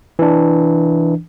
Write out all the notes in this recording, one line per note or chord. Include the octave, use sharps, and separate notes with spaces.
E3 D4